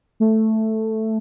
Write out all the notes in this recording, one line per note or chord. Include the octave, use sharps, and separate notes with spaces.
A3